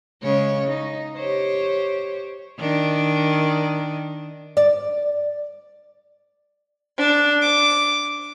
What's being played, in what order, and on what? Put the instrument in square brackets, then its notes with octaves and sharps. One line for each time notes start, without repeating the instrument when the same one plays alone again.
[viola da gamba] C#3 G#3 C#5
D#4
G4 C5 C#5
D#3 D4
[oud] D5
[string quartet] D4
D6